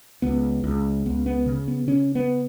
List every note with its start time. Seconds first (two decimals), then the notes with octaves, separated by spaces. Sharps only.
0.22 C#2 B3
0.64 C#2
1.06 C#2 B3
1.26 B3
1.46 C#3
1.68 B3
1.87 C#3 C#4
2.15 B3